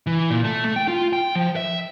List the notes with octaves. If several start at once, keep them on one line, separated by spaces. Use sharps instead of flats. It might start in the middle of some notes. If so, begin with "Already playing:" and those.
E3
A#2
A3
A3
G5
F4
G5
F3
E5